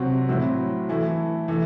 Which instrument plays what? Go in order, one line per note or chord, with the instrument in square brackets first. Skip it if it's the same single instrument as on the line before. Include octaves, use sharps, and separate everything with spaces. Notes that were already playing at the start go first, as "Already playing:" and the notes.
Already playing: [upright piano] C3 F#3 C4 F#4
A2 F#3 C4 E4
E3 A3 E4
E3 A3 E4